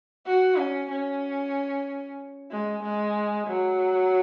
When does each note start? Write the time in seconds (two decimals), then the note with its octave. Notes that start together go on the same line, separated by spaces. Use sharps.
0.26 F#4
0.58 C#4
0.91 C#4
2.51 G#3
2.83 G#3
3.48 F#3